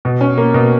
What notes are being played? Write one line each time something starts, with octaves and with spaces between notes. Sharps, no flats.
B2
C#4
A#3
B2